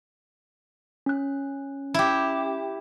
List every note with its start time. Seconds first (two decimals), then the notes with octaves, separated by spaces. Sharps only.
1.06 C#4 F#6
1.94 E4 G4